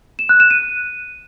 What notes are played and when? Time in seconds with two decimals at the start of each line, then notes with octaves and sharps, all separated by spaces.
0.19 E7
0.29 F#6
0.40 E7
0.50 D#7